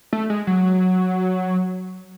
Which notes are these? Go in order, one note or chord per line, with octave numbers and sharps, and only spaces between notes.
A3
G#3
F#3